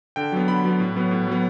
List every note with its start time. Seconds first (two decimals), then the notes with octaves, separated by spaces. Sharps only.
0.16 D3 G5
0.32 F#3 B3
0.48 D3 B5
0.64 F#3 B3
0.80 A2
0.96 F#3 B3
1.11 A2
1.27 F#3 B3